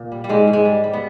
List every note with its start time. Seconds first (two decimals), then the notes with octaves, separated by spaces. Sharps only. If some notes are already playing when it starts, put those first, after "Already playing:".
Already playing: A#2
0.12 G3
0.24 G3
0.29 G#2 G#3
0.48 G#2
0.53 G#3
0.65 G3
0.84 G3
0.93 B3